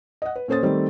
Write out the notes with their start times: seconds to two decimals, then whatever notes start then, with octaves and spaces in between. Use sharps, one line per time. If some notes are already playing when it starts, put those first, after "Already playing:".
0.22 D#5 F#5
0.36 B4
0.48 A#2 C#4 A4 C5 D#6 A6
0.63 D#3 G3 A3 C4